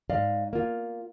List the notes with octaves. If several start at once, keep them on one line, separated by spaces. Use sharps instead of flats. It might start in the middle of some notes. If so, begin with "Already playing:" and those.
G#2 D5 D#5 F5
A#3 F4